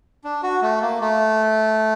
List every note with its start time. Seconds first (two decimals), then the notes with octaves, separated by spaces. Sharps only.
0.24 D4
0.43 F#4
0.62 A3
0.82 A#3
1.01 A3